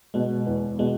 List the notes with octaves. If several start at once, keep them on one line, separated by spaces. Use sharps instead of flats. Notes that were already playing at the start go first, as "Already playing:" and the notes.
B2 G#3
E2
B2 G#3